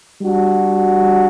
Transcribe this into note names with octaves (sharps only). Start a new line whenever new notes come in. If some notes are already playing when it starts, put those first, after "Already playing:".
G3 D4 F#4